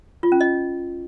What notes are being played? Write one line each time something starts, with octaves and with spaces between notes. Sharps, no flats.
F4
C#4
D#5